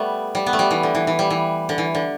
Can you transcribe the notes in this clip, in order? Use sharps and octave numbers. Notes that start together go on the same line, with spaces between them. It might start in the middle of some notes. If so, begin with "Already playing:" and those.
Already playing: G3 A3 B3
G3
B3
A3
G3
E3
D3
E3
E3
G3
E3
D3
E3
D3